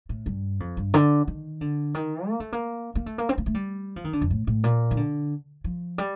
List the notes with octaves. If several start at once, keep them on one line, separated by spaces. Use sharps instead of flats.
A2
G2
F2
G2
D3
D#3
D3
D#3
A#3
A3
A#3
A#3
A3
A#3
C4
A#3
A3
G3
F3
D#3
D3
F2
A2
A2
A#2
D#3
D3
F3
G3